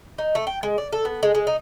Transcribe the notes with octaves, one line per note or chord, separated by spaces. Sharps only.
D#4
A3
G5
G#3
D5
A4
B3
G#3
G#3
D#4